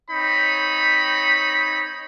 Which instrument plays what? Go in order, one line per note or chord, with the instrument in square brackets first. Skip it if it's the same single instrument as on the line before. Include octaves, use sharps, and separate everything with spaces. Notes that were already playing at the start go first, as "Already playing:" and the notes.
[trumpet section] C4 D#4 C#5 B5